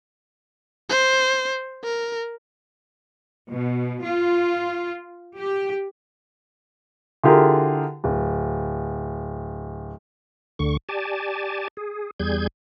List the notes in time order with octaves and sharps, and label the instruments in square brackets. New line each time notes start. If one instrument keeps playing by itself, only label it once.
[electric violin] C5
A#4
[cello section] B2
F4
G4
[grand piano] D3 E4 F4 G4 G#4 A#4
D1
[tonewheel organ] D2 D3 C#6
G4 D5 G#5 A5
G#4
E2 G3 G#4 G6 G#6